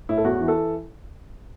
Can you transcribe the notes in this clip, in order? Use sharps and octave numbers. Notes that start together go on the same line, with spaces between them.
A2 E4
A4
E2 F#4
E3
A4